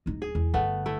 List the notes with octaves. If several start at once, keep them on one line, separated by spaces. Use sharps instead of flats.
D1 D#4
G#4
E2
G1 D3 A3 B3
A3 E4